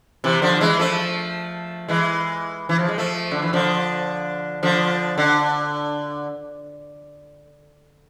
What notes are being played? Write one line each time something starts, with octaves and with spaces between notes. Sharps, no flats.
C3 E3
D3 F3
E3 G#3
F3 A3
E3 G#3
E3
F3
G#3
F3 A3
D3
E3
D3 F3
D3 F3
D3